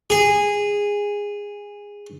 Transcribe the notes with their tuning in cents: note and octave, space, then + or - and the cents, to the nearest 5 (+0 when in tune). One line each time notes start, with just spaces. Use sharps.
G#4 -15